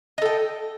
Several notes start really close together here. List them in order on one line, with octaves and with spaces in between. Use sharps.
D#5 A4 G5